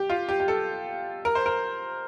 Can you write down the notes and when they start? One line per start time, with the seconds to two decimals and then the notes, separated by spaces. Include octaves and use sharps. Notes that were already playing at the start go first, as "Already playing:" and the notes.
Already playing: G4
0.10 F4
0.29 G4
0.40 G4
0.48 A4
1.25 A#4
1.35 C5
1.46 A#4